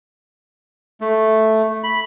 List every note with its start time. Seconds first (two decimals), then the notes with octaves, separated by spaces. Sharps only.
1.01 A3
1.84 B5